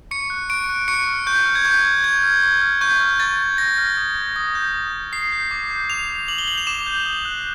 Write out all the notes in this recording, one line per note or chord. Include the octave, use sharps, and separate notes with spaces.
C#6 C#7
F#6
C#6 D7
F#6
C#6 C#7
F6
C#6 G6
F6
G#6
C#6 G6
F6
C#6 G#6
F6
C#6
F6
C#6 G6
F6
C#6 A6
F6
C#6 A#6
F6
D#6
G6
D#6
G6
D#6
G6
D#6 C7
G6
D6
G6
D6 F7
G6
D6 F#7
G7
G6 F#7
F7
D6 E7
G6
D#6
F#6